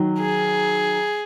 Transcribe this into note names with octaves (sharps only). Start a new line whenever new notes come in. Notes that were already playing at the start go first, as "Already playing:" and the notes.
Already playing: D#3 F#3
G#4